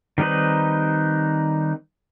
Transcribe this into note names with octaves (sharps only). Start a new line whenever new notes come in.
D#3 G3 C4 D#4 B4